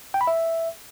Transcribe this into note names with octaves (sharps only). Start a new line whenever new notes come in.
G5
B5
E5